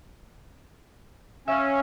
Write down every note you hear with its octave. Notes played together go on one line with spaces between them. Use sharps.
C#4 E5 F5